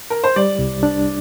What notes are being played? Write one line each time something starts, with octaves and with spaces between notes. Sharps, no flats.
A#4
C5
G3 D5
C2
D4